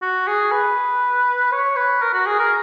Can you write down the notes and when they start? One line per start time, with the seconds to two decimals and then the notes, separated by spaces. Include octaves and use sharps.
0.02 F#4
0.27 G#4
0.52 B4
1.52 C#5
1.76 B4
2.02 A#4
2.14 F#4
2.26 G#4
2.39 A#4